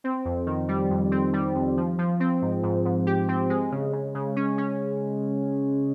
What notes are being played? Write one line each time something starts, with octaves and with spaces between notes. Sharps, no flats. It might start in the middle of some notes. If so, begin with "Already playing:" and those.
C4
F2
D#3
G3
F2
C4
G3
F2
F3
F3
C4
G#2
G#2
G#2
G4
C4
G#3
C#3
C#3
C#3
C#4
C#4